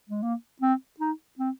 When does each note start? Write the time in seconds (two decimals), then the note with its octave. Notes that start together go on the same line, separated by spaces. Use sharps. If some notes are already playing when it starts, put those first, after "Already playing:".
0.09 G#3
0.23 A#3
0.62 C4
1.00 D#4
1.39 C4